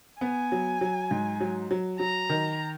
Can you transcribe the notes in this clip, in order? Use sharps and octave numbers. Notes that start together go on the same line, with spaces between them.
B3 G#5
F#3
F#3
G#2
F#3
F#3
F#3 A#5
D#3